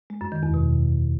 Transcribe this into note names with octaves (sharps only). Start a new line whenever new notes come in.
G#3
F#2
D#3
E2
B2